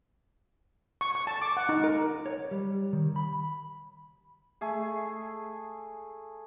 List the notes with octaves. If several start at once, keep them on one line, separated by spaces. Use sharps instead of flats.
C#6
C#6
A5
D6
F#5
D#4
A#4
C#5
G3
D#3
B5
A3 G#4